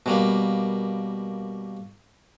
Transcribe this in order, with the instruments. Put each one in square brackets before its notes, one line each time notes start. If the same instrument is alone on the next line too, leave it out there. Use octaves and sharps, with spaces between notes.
[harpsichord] B2 G3 A#3